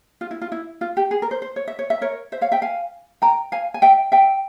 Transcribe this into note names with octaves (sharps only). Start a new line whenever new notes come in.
F4
E4
F4
E4
F4
G4
G#4
A#4
C5
C5
C#5
E5
C#5
E5
A#4 C#5
C5 E5
C#5 F5
E5 G5
F5 G#5
G5 A#5
F5 G#5
G#5
E5 G5
E5 G5